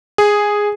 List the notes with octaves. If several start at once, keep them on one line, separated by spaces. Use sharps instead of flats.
G#4